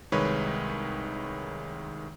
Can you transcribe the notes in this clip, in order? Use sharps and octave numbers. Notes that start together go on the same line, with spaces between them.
C2 D#3 G#3 B4 C#5